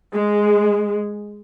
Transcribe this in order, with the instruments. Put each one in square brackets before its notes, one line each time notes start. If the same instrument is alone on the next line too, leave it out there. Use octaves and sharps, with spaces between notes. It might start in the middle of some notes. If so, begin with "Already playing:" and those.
[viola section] G#3